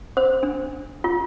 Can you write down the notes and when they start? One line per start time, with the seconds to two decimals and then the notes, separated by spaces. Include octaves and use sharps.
0.17 C5
0.43 D4
1.04 F4